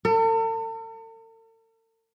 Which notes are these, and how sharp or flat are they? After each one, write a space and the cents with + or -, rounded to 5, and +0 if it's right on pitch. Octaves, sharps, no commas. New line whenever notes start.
A4 +45